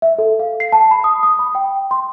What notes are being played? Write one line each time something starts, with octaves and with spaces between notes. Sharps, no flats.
E5
A4
F5
C7
A5
B5
D#6
D#6
B5
G5
C6